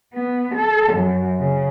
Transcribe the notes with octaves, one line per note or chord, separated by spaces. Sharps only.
B3
A4
F#2
C#3